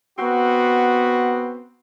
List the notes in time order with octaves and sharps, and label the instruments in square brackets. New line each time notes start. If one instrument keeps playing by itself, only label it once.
[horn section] B3 C4 F#4